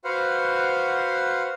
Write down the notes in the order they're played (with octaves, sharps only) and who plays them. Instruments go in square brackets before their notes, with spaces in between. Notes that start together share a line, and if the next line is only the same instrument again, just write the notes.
[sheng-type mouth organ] F#4 B4 C5 F5 F#5